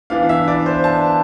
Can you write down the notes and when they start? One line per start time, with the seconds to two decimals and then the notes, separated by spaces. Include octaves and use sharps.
0.10 E3 B3 D4 F5
0.29 E5
0.48 D5
0.66 C5
0.84 A5